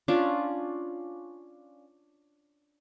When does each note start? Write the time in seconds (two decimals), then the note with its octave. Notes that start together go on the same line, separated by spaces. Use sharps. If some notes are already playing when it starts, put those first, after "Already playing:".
0.08 C#4 D4 F4